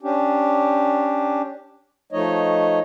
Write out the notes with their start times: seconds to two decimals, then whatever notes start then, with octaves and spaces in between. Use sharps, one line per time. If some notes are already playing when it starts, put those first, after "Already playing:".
0.02 C#4 D4 G4
2.12 F3 A3 D#4 C#5 D#5